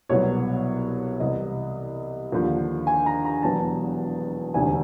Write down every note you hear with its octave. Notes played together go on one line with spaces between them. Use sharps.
C2 B2 F#3 C#5
C2 C3 E3 D#5
D#2 D3 F3
G#5
A#5
A#5
E1 E2 B2 F#3 A5
E1 D2 C3 D#3 G#5